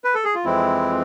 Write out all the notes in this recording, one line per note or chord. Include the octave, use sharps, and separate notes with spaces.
B4
A4
G#4
F4
F2 E3 G#3 C4 E4